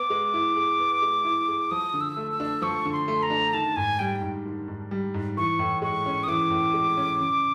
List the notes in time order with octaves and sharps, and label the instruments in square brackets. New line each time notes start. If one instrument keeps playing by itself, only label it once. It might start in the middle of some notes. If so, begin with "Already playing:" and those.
Already playing: [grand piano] B3 [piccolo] D6
[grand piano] G#3
E4
G#4
B3
G#3
E4
G#4
[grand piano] F3 [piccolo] D#6
[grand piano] D3
[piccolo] E6
[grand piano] A3
[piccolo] E6
[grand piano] D4
[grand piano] F3 [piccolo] C#6
[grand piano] D3
[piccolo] C6
[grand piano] A3
[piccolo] A#5
[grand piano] D4
[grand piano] D#3 [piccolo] A5
[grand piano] G#2 [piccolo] G#5
[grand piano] G3 [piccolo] G5
[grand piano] G#2
D#3
G#2
G3
G#2
[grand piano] E3 [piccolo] C#6
[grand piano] A2
[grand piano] G#3 [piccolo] C#6
[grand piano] C#4
[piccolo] D#6
[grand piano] E3 [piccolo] D6
[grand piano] A2
G#3
C#4
C#3